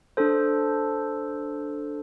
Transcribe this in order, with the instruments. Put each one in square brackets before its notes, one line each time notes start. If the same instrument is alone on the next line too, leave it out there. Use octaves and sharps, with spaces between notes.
[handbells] D4 A4 C5